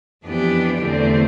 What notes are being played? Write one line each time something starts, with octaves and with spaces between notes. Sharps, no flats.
F2 E3 B3 D4 G4
E2 D3 A3 C4